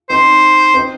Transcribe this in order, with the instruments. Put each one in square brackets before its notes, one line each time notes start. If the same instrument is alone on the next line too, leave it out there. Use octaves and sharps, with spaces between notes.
[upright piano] C4 D#4 [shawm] C5
[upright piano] C4 D#4